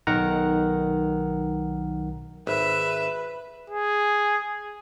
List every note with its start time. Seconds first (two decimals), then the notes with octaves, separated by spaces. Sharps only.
0.07 B1 D#3 A#4 F#5 A#5
2.47 G#1 B4 E5
3.70 G#4